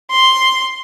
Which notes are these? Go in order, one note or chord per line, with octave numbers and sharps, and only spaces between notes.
C6